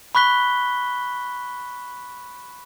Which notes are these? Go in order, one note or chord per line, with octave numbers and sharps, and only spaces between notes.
B5 C#6 F#6 B6 G7